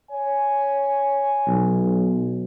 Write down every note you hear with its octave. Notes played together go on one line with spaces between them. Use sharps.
C#5 G#5
B1